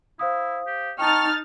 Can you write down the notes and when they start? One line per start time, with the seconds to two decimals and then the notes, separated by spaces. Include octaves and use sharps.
0.19 E4 C5 F5 D#6
0.67 G4
0.99 D#4 G5 A5 A#5 C#6 F6 A6